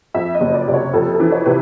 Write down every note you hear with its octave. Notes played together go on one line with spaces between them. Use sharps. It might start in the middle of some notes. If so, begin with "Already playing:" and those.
F2 E5
D#5
F#1
D5
C3 D5
C#5
F2 A4
A4
E3
C#5
C3 B4